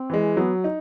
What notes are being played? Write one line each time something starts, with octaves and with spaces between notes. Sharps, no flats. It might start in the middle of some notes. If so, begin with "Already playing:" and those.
Already playing: C4
E3 G#3
F#3 B3
D#4